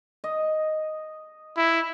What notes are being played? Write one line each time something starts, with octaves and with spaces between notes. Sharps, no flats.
D#5
E4